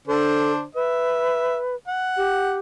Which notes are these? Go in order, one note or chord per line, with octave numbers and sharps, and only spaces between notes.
D3 D4 A4 C5
B4 E5
F#5
G4